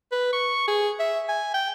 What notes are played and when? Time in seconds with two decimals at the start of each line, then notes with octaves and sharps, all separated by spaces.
0.12 B4
0.33 C#6
0.68 G#4
1.00 E5
1.29 G#5
1.54 G5